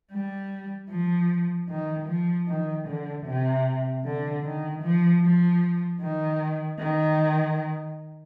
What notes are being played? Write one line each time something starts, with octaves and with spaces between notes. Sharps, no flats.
G3
F3
D#3
F3
D#3
D3
C3
D3
D#3
F3
F3
D#3
D#3